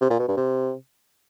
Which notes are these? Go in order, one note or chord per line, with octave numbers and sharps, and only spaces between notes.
C3
A#2
B2
G2
C3